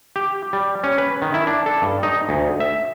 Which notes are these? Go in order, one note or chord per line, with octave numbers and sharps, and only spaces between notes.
G4
G3
C#4
B4
D#3
E4
D4
A4
G2
D#4
D2
E5